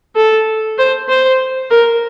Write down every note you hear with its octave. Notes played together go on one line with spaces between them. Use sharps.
A4
C5
C5
A#4